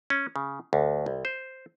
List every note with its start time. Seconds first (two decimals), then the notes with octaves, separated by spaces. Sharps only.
0.10 C#4
0.36 C#3
0.73 D2
1.06 C2
1.25 C5